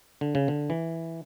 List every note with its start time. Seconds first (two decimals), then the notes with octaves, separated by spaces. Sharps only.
0.21 D3
0.35 C#3
0.48 D3
0.70 E3